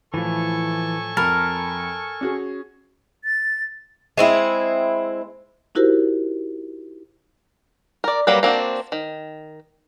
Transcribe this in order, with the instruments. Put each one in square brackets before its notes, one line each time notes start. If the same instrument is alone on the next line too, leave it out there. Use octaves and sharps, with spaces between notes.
[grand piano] A2 F3 [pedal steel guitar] E3 [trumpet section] A4 G#5 C#6
[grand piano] F2 B5 [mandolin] A#4 [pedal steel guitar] A5
[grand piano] C#4 F#4 G#4
[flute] A6
[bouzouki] G#3 C4 E4
[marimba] D#4 E4 F#4 G4 A#4 C5
[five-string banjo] A#4 D5
F#3 G3 A#3 B4
A#3 C4 D4 F#4
D#3